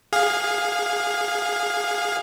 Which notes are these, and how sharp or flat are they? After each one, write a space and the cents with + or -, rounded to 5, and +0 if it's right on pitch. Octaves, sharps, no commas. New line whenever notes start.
G#4 -10 F5 +15